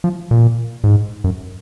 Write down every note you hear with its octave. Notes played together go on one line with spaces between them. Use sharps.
F3
A#2
G#2
F#2